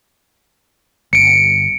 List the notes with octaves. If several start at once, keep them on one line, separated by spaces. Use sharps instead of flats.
G1 C#7 D7